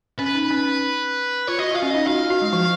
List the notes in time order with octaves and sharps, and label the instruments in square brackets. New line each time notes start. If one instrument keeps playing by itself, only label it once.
[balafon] C#4 [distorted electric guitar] B4
[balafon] D#4
C#4
[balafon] F4 [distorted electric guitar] C#5
[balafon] F#4 [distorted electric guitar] D#5
[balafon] F4 [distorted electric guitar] F5
[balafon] C#4
[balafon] D#4 [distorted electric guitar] D#5
[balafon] F#4 [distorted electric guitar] F5
[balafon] F4
F#4
G#3
F3